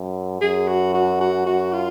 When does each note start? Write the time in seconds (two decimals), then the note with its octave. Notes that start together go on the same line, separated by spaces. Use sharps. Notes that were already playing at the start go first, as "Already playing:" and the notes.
Already playing: F#2
0.41 F#2 G#4
0.68 F#4
0.94 F#4
1.21 F#4
1.46 F#2 F#4
1.73 F4